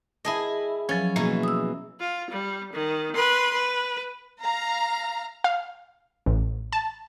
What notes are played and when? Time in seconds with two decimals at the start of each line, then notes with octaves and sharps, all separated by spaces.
0.25 E4 G#4 D#5 A5 D#6 A#6
0.89 F3 F#3 C#4
1.16 B2 E3 A#3 G#4
1.43 D#6 E6
1.99 F4
2.30 G3
2.73 D#3
3.15 B4 C6
3.53 B4
4.40 F5 A#5
5.44 F5
6.26 A1
6.72 A5